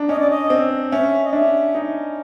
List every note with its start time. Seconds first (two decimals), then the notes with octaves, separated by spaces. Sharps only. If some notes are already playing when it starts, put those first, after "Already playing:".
Already playing: D4 D#4
0.09 C#4 D#5
0.19 D5
0.31 D#5
0.50 C4
0.92 C#4 E5
1.24 D#5
1.33 D4 E5
1.75 D#4